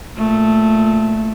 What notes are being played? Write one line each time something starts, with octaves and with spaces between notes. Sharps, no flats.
A#2 A3